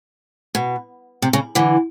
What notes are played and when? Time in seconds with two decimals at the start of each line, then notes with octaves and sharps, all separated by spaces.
0.55 B2
1.22 C3
1.33 C#3
1.55 D3 E3